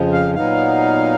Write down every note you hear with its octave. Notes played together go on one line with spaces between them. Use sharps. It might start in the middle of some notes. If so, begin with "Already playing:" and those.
Already playing: F2 C#3 F3
F5
A#2 F#3 B3 D#4 F5